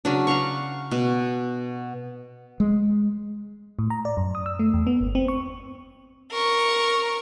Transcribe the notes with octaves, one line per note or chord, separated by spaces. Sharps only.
C#3 F#3 D4
F5 F#5 A#5 C#6
B2
G#3
A2
A#5
D5
F#2
D#6
E6
A3
E2
B3
G1
C4
C#6
A#4 C#6